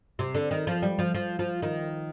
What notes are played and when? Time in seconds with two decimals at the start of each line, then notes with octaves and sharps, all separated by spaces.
0.19 C3
0.35 D3
0.51 D#3
0.67 F3
0.82 G3
0.99 F3
1.14 F3
1.39 F3
1.62 D#3